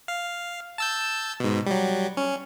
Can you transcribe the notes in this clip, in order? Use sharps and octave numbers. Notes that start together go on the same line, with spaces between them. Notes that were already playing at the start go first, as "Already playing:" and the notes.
F5
A5 E6 G6
G#2 B2
F#3 G3
C#4